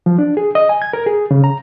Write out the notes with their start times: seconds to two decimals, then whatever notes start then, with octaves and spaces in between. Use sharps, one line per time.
0.06 F3
0.18 D4
0.37 G#4
0.55 D#5
0.69 G#5
0.82 G#6
0.93 A#4
1.06 G#4
1.31 C#3
1.44 A#5